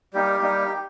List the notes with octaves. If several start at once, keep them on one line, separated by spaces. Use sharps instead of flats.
G3 A#3 D#4 G4
G3 A#3 D#4